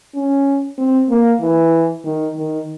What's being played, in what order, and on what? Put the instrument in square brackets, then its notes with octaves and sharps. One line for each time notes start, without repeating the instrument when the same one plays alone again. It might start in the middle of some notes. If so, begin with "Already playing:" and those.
[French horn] C#4
C4
A#3
E3
D#3
D#3